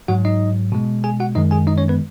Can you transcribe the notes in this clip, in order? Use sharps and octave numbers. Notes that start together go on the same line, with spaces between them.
G#2 F#3 F#4 F#5
D#4 D#5
B2 G#3
G#4 G#5
F#4 F#5
F#2 D#3 G#3 D#4 D#5
G#4 G#5
D#4 D#5
C#4 C#5
B3 B4